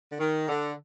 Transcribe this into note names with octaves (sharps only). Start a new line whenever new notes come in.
D3
D#3
D3